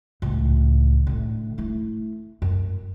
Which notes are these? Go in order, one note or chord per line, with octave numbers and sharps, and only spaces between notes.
C#2 A2
A2 D3
A3 E4
F#2